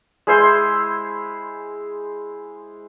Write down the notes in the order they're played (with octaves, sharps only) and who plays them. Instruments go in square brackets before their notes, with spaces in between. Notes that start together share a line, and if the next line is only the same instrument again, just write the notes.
[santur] G#3 E4 C5 C6